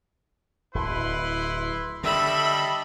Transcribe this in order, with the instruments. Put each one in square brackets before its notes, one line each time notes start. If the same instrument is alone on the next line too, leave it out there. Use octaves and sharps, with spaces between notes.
[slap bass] D1 [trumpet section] E4 B4 C6
[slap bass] D3 [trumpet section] G3 A4 D#5 [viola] E5 B5